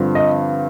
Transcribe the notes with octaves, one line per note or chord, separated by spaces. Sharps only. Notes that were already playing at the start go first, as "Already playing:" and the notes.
Already playing: G2 D3 F3 C4
D#5